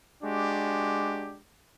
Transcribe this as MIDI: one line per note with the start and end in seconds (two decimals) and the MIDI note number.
0.23 1.38 56
0.23 1.38 62
0.23 1.38 66
0.23 1.38 67